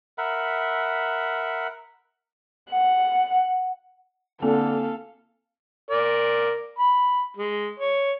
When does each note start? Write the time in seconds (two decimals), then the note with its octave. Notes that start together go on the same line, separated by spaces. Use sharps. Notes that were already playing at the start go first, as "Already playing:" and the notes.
0.18 A#4 E5 F#5 B5
2.71 F#5
4.42 D3 A#3 C4 A4 F5 G#5
5.89 A#4 D5
6.78 B5
7.37 G#3
7.80 C#5